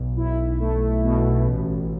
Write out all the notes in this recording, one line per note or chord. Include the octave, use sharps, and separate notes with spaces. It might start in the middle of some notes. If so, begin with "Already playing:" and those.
Already playing: B1
E4
A3
B2
A1